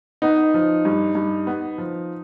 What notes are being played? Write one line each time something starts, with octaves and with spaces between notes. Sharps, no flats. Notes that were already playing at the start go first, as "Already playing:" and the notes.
B3 D#4
F3
G2
G2
B3
F3